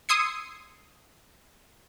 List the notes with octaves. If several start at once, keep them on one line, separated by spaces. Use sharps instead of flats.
C6 D#6 E6 G#6 C7 C#7